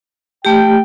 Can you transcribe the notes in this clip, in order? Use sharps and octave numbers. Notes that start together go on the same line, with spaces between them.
A3 G4 G5